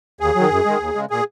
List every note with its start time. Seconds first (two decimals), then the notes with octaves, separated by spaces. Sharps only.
0.20 D#2 G#4
0.35 D#3 F#3
0.50 F#2
0.65 D#3 G#3
0.80 D#2
0.95 C#3 G#3
1.10 A#2 G#4